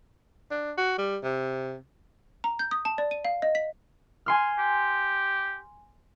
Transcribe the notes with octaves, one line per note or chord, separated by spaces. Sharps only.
D4
F#4
G3
C3
A#5
G6
D#6
A5
D5
D#7
F5
D#5
B6
G#5 C6 F6
G4